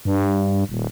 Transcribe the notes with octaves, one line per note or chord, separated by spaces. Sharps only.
G2
D#1